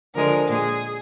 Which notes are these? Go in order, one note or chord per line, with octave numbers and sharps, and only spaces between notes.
D3 F3 G#3 A#4
A#2 G#3 G#4